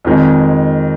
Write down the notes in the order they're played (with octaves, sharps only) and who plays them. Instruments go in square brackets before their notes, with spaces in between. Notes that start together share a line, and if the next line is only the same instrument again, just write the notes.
[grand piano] F2 D#3 G#3